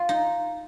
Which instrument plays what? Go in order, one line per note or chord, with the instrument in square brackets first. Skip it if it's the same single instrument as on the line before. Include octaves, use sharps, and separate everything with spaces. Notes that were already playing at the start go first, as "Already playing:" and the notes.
Already playing: [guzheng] F4
D#4